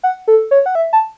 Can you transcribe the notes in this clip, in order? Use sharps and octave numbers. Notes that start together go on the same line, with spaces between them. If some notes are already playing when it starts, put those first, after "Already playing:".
F#5
A4
C#5
F#5
E5
A5